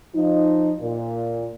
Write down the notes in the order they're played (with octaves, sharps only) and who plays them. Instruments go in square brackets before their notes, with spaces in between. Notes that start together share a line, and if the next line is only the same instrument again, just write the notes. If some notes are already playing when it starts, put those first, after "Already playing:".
[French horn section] F3 D#4
A#2